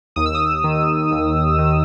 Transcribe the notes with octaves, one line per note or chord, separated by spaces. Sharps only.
D#2 D#6
E6
D#6
D#3
D#2
D#3